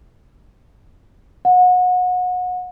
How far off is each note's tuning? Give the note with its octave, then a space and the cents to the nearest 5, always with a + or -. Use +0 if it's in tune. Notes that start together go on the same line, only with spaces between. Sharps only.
F#5 -30